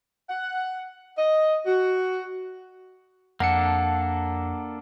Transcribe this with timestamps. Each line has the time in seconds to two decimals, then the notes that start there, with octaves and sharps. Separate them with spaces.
0.30 F#5
1.17 D#5
1.66 F#4
3.40 F2 A#3 D4 A4 F#5 C#7